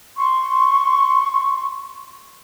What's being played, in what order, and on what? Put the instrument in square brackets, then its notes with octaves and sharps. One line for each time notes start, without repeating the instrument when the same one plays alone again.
[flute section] C6 C#6